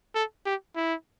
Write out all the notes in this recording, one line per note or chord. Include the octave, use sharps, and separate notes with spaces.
A4
G4
E4